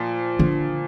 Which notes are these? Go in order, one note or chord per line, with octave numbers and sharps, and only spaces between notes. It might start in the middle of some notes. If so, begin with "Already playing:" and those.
Already playing: A#2 F3
D3